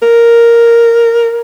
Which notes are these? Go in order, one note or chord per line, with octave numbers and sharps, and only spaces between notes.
A#4